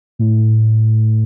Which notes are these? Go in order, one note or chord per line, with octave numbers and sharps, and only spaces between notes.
A2